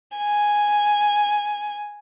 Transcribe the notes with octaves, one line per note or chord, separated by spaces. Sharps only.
G#5